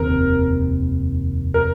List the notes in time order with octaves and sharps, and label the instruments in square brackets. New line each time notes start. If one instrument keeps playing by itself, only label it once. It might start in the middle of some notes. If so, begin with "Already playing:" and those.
Already playing: [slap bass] F1 D#2 D#3 C4 [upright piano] A#4
[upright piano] A#4